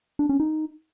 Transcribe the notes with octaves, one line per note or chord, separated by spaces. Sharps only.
D4
C#4
D#4